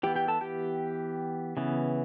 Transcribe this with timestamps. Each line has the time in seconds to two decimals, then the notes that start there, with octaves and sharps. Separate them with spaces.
0.03 E3 B3 G4 G5
0.16 G4 G5
0.28 A4 A5
0.41 G4 G5
1.57 C#3 E3 B3